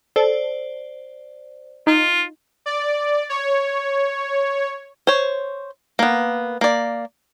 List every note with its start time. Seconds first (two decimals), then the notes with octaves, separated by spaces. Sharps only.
0.16 A4 C5 D5
1.87 D#4 F4
2.66 D5
3.29 C#5
5.07 C5 C#5
5.99 A#3 B3
6.61 A#3 D5